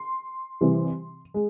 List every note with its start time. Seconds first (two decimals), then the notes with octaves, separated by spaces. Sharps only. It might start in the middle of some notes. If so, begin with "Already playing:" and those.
Already playing: C6
0.61 C3 E3 G3
1.34 G#3